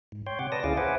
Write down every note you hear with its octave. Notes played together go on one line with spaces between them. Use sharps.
G#2
C#5 G5 C6
C3 F#5 D6
B4 D5 A5 D#6 A#6
D2 C#4 E4 G#4 F5 D6
B4 C5 E5 F#5 G#5 D6